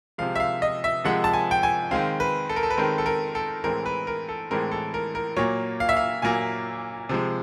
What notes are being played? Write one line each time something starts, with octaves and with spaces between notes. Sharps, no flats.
C3 F3 G#3 F5
E5
F5
D#5
E5
C3 F3 G#3 F#5
A5
G#5
G5
G#5
D#3 G#3 C4 F5
B4
A4
A#4
A4
B4
D#3 G#3 C4 A#4
A4
A#4
A4
A2 E3 G#3 C4 A#4
B4
A#4
A4
A2 E3 G#3 C4 A#4
A4
A#4
A#4
A#2 F#3 A#3 C#5
F5
E5
F5
A#2 F#3 A#3 G#5
C3 F3 G#3